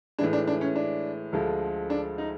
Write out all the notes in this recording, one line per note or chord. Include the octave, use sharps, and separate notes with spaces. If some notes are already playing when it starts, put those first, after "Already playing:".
A2 E3 G#3 D4
D4
D4
C#4
D4
D2 D3 F3 G#3
D4
D#4